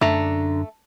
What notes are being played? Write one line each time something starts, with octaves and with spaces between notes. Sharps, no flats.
F#2 D3 A3 D4 A#5